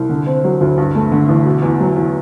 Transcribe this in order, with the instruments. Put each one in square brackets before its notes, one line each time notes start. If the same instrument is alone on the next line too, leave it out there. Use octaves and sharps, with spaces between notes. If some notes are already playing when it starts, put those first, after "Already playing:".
Already playing: [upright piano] C2
D3
C4
F#3
D2
G2
A3
D3
A1
B2
E2
F#3
E2